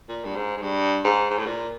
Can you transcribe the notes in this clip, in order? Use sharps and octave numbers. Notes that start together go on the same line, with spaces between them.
A#2
G2
G#2
G#2
G2
G#2
G#2
A2
A#2